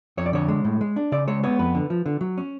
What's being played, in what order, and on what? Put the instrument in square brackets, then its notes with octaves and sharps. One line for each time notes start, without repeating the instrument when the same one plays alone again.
[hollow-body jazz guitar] F2 C#5
D5
D3 C#5
G#3
A2
G#3
D4
C#3 D5
G#3 C#5
B3 C#5
F2 B4
D3
F3
D3
F#3
C#4